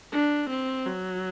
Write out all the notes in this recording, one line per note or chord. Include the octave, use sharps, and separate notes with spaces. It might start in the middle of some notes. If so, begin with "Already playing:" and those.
D4
C4
F#3